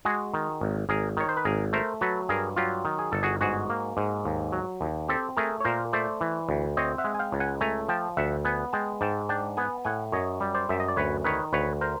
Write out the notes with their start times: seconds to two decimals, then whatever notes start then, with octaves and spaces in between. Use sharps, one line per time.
0.05 G#3 F#4 G#4
0.34 D#3
0.61 G#1
0.89 G#1 G#4 A#4
1.17 D#3 C#5
1.29 C5
1.37 B4
1.45 G#1 G#4 A#4
1.73 A3 A#4 C5
2.01 F#3 A4 B4
2.29 G2 G#4 A#4
2.56 F#3 F4 G4
2.85 D#3
2.99 G#4
3.12 G1 A4
3.23 F#4 G#4
3.41 G#2 F#4 G#4
3.70 A#3
3.97 G#2
4.25 D#2
4.52 F#3
4.81 D#2
5.08 C4 G4 A4
5.37 A3 G#4 A#4
5.60 C#5
5.64 A#2 A#4 C5
5.93 A3 C5 D5
6.21 E3
6.49 D2
6.77 C4 C#5 D#5
6.98 E5 F#5
7.04 G#3
7.15 G#5
7.19 F5 G5
7.32 C#2
7.40 F#5 G#5
7.61 A3 G#5 A#5
7.89 F3 G5 A5
8.17 D2 E5 F#5
8.45 B3 F#5 G#5
8.73 G#3 G5 A5
9.01 G#2 G5 A5
9.29 D4 G5 A5
9.57 B3 F#5 G#5
9.85 A2 F#5 G#5
10.12 F#2 C#5 D#5
10.40 G3
10.54 C5 D5
10.69 F#2 E5
10.80 D#5
10.88 D5
10.96 D2 B4 C#5
11.24 D#3 B4 C#5
11.53 D2 B4 C#5
11.81 A#4 C5